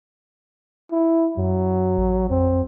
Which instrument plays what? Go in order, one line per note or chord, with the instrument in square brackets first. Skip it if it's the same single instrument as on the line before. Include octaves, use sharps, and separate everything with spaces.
[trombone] E4
[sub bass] F#2 [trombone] F#3
[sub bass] A1
[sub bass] F2 [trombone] C4